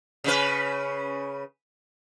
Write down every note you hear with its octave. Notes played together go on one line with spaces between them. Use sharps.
C#3 C#4 B4